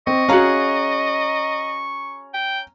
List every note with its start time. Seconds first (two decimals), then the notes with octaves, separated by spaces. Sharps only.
0.07 C4 D#5 C#6
0.29 C#4 F#4 G#4 F5 A#5
2.34 G5